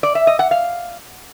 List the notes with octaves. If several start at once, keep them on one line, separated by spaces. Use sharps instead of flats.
D5
E5
D#5
F#5
F5